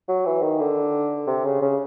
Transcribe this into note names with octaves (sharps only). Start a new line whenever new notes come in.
F#3
E3
D#3
D3
C3
C#3
C#3